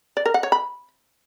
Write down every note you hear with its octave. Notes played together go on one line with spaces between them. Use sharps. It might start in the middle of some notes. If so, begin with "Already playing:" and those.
D5
A#4
F#5
C#5
B5